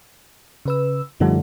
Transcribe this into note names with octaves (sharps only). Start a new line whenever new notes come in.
C#3 B4 E6
F#2 D3 F3 G3 A3 D#4